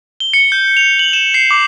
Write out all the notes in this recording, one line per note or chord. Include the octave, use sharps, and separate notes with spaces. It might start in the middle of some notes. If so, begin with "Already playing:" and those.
G7
C#7
G6
F7
F#7
E7
C7
D6